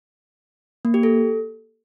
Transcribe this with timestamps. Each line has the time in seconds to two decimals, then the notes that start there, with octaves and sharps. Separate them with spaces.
0.85 A#3
0.94 G4
1.03 A4